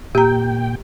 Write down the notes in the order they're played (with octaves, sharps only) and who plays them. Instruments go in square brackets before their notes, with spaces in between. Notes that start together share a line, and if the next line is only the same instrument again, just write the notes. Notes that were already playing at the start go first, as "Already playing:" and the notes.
[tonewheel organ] A#2 G5 [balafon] G4 A#5